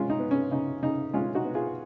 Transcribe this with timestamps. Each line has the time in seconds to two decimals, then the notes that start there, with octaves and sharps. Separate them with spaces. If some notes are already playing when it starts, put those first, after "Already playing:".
Already playing: G#3 C#4 F4
0.10 D#4
0.20 B3
0.31 C#4
0.51 C#3 D#4
0.83 C#3 D#4
1.13 G#3 C#4 F4
1.35 D#4 F#4
1.45 B3
1.55 F4 G#4